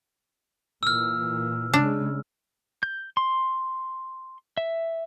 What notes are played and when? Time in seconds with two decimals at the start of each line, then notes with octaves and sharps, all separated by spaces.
0.83 A#2 E3 E6 F6
1.74 C#3 G#3 D4
2.83 G6
3.17 C6
4.57 E5